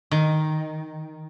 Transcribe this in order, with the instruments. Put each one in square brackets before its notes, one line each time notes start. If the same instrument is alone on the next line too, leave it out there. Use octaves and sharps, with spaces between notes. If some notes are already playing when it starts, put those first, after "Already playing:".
[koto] D#3